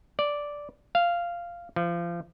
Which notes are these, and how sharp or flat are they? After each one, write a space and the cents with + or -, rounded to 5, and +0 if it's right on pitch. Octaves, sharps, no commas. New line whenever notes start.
D5 -5
F5 -10
F3 -30